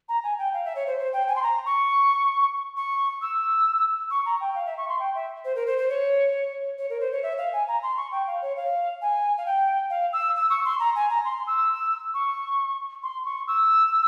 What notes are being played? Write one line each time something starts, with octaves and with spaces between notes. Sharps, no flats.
A#5
G#5
G5
F5
E5
C#5
C5
C5
G5
G#5
C6
A#5
C#6
C#6
E6
C#6
A#5
G5
F5
E5
C#6
C6
G5
E5
C5
A#4
C5
C5
C#5
C#5
A#4
C5
C#5
E5
F5
G#5
A#5
C6
C#6
G5
F5
C#5
F5
G#5
F5
G5
F5
E6
E6
C#6
C6
A#5
G#5
A#5
C6
E6
C#6
C6
C#6
E6